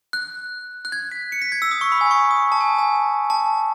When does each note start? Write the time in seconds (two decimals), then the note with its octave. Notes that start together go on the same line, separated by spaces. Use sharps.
0.13 F#6
0.85 F#6
0.92 G#6
1.12 B6
1.32 C#7
1.42 B6
1.52 G#6
1.62 E6
1.71 D#6
1.81 C#6
1.92 B5
2.01 G#5
2.11 C#6
2.31 D#6
2.52 A5
2.61 G#5
2.79 G#5
3.30 A5